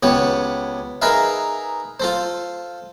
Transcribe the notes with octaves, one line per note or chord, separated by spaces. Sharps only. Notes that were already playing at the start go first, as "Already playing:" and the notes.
C#2 B3 G4 C#5
D#4 G#4 A#4 B4 E5 F5
F4 A4 C5